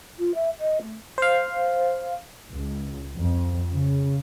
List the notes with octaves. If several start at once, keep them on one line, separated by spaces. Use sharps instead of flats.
F4
E5
D#5
A3
C5 F5
C#2
F2
C#3